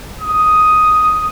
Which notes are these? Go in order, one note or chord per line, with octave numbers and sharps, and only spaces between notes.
D#6